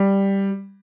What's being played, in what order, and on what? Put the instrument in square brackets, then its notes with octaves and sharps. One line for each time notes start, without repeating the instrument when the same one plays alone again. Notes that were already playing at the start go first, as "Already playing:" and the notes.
Already playing: [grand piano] G3